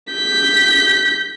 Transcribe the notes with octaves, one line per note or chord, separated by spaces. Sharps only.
G6 B6